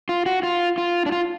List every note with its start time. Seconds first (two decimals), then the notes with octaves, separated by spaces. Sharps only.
0.09 F4
0.26 F#4
0.43 F4
0.78 F4
1.06 D4
1.12 F4